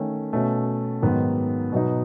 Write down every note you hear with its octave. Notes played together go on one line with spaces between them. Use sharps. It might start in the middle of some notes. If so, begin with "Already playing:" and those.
Already playing: D#3 A3 C#4
B2 A3 C#4
G#2 D#3 F#3 B3
B2 F#3 B3 D#4